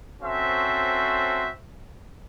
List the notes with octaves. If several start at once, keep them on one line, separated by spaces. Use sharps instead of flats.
C4 C#4 F#4 A4 C5 E5